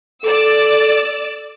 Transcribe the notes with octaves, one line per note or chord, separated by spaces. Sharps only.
A4 D5 E6